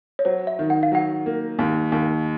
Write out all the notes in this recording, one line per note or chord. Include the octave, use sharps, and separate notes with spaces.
C#5
F#3 C5
E5
D#3
F#5
F5
F#3 F#5
A#3
D#2
D#2